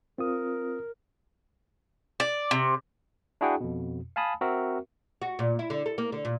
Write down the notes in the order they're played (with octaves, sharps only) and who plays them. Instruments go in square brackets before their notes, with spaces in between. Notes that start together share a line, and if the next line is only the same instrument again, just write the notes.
[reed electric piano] C4 F4 D#6 [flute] A#4
[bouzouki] D5
C3
[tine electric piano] D4 E4 F#4 G#4 F#5 G5
F2 B2
F5 G#5 A5 B5 D#6
C4 F#4 A#4 E5
[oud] F#4
A#2
E4
D3
A4
A#3
D3
A#2